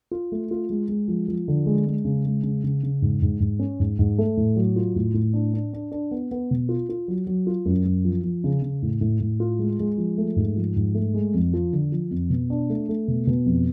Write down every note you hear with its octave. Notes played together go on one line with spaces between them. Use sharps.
F4
A3
F4
G#3
G#3
F3
F3
D3
G#3
G#3
C#3
G#3
C#3
C#3
C#3
G#2
G#2
G#2
C#4
G#2
G#2
A3
A2
F#3
F4
A2
A2
D4
D4
D4
D4
B3
B3
B2
F4
F4
F#3
F#3
F4
F#2
F#2
F3
F3
C#3
C#3
A2
A2
A2
F4
G#3
G#3
F3
A3
G#2
F3
G#2
A3
G#3
F2
F3
D3
F3
F2
B2
D4
A3
A3
B2
B2
F2